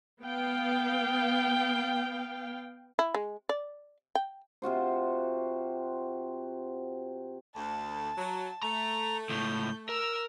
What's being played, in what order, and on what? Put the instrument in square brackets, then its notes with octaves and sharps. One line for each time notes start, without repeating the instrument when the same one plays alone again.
[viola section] B3 F5 G5
[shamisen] E4
G#3
D5
G5
[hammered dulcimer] C3 F4 F#4 C5
[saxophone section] D2 [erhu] A5
[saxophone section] F#3
[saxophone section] A3 [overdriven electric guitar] A#5
[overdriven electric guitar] C#2 A2 [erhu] G6
[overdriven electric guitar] A#4 [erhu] E6